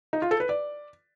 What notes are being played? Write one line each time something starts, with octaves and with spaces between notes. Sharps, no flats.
D#4
F4
A4
B4
D5